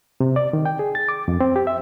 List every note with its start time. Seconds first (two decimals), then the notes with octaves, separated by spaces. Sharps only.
0.20 C3
0.36 D5
0.53 D#3
0.66 G5
0.79 G#4
0.95 A6
1.09 D6
1.28 F2
1.41 C4
1.56 G4
1.67 E5